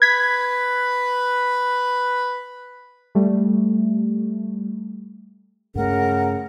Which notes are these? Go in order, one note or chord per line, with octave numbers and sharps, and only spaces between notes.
B4 G#6 B6
G3 A3
G2 C#3 A3 A#4 F#5